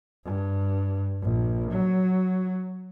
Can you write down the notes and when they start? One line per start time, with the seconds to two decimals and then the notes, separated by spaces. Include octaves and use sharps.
0.25 G2
1.21 A#1
1.72 F#3